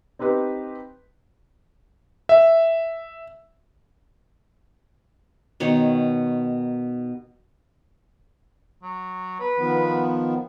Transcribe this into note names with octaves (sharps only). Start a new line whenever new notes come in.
C4 D#4 G4 B4
E5
B2 D#3 C#5
F#3
B4
D#3 F3 B3